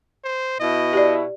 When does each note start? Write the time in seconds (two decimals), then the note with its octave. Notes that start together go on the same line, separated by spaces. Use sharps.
0.24 C5
0.60 B2 E4 D#5
0.93 G4 D5